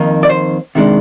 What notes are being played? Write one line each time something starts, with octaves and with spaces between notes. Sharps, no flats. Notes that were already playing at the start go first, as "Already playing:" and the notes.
Already playing: F2 D#3 A#3 D#4
D5
C5
C3 D#3 G#3 D4